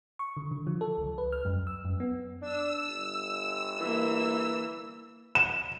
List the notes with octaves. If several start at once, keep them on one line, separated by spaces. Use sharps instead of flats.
C#6
D3
D3
F3
A4
C#2
B4
F6
F#2
E6
F#2
B3
D4 E6
G1
E3 A#3
E7